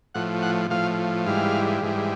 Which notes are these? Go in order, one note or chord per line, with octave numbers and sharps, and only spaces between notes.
A2 F3 F#5
F#5
A2 F3 F5
G#2 E3 G3 F5
G#2 E3 G3